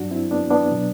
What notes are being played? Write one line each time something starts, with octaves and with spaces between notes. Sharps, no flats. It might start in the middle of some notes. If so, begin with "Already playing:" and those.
Already playing: G2 F#3 D4 F#4
C4 E4
B3 D4
B3 D4
B2 F#3